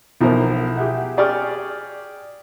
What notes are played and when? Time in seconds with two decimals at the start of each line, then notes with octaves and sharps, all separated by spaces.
0.21 B1 E3 F3 E4 A#4 C5
0.76 G4 G#4 E5 F#5
1.17 G4 G#4 D5 C#6 D6 F6